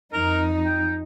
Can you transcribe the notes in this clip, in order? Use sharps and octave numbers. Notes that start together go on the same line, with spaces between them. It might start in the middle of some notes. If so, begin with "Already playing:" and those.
F2 D#4 A#4
G5